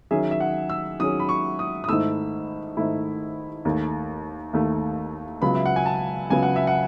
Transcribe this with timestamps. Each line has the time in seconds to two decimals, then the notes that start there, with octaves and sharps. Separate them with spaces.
0.11 D#3 F#3 C#4 G#4 E5
0.31 E5
0.40 F#5
0.69 E6
0.99 D#3 F#3 C#4 G#4 D#6
1.20 B5
1.29 C#6
1.59 D#6
1.84 D#6
1.88 G#2 D#3 A3 E4 E6
2.77 G#2 D#3 A3 E4
3.65 D#2 D#3 A3
4.53 D#2 D#3 A3
5.42 C#2 C#3 F#3 B3 B5
5.55 E5
5.66 F#5
5.76 G#5
5.86 A5
6.30 C#2 C#3 F#3 B3 G#5
6.43 F#5
6.56 E5
6.67 F#5